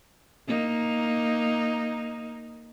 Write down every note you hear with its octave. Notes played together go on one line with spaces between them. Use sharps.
A#3 D#4